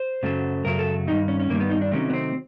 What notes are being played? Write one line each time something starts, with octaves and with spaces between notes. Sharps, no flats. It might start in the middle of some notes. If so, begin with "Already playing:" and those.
Already playing: C5
F#2 C#3 F#3 A3
F#2 C#3 F#3 A3 A#4
A4
G2 D#3 G3 D#4
C#4
C#4
G2 D#3 G3 A#3
B3
D#4
D4
C3 D#3 F#3 A3 C#4
B3
C4